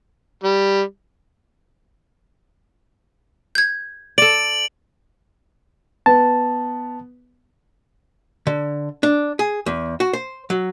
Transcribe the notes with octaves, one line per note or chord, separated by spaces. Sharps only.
G3
G6 G#6
A4 D5 D7 F#7
B3 A5
D3
D4
G#4
E2
F#4
C5
F#3